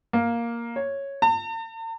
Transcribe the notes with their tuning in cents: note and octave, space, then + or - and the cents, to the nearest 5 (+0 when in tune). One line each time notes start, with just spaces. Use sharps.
A#3 +5
C#5 -5
A5 +45